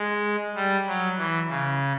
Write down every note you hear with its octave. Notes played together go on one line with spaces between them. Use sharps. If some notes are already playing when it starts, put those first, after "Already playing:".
Already playing: G#3
G3
F#3
E3
C#3